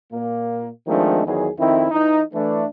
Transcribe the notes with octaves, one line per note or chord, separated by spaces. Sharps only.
A#2 A#3
D#3 F3 G#3 A3 C4 D4
E2 D#3 F#3 G#4
F2 D#3 C4 E4
E3 D#4
E3 A3 D4